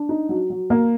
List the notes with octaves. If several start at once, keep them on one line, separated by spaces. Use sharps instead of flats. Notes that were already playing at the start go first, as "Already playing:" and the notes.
Already playing: D4
D#4
F#3
F#3
A#3